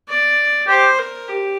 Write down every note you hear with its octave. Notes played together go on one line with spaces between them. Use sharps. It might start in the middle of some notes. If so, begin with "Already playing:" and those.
D5
G4 C5
A#4
G4